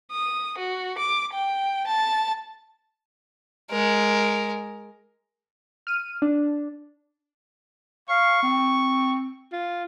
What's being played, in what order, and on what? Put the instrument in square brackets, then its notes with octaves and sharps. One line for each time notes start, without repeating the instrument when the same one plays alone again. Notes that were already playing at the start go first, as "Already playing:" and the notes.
[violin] D#6
F#4
D6
G5
A5
[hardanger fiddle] G#3 A#4
[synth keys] F6 D#7
D4
[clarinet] F5 [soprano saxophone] C#6
[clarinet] C4
[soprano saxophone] F4